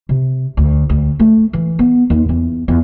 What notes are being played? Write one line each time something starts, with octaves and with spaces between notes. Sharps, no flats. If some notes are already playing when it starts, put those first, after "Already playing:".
C3
D2
D2
A3
E3
B3
D#2
E2
E2